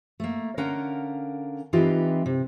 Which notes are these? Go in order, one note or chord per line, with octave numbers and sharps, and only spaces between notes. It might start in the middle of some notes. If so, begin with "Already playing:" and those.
A3 A#3
D3 C#4 A#4 F5 F#5 A#5
E3 C4 D#4 F4 G4 B4
C3